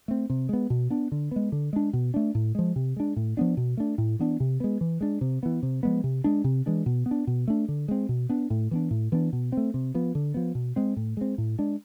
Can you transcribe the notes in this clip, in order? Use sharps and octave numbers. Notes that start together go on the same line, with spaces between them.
A3 C4
C3
G#3 B3
B2
B3 D4
D3
G#3 B3
D3
G#3 D4
B2
A3 D4
A2
F3 G#3
C3
G#3 D4
A2
F3 B3 D4
B2
A3 D4
A2
E3 B3 D4
C3
G#3 B3
E3
G#3 D4
C3
E3 B3
C3
F3 G#3 B3
C3
G#3 D4
C3
E3 G#3 D4
B2
B3
D4
B2
A3 D4
D3
G#3 C4
B2
B3 D4
A2
E3 B3 D4
A2
E3 B3 D4
B2
A3 C4
C3
F3 B3
D3
F3 B3
B2
G#3 C4
A2
G#3 C4
A2
G#3 D4